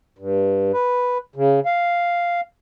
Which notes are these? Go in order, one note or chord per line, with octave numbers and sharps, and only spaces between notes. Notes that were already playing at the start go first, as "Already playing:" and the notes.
G2
B4
C#3
F5